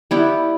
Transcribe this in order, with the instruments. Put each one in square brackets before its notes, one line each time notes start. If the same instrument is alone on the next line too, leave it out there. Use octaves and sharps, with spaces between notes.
[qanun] G3 B3 E4 G4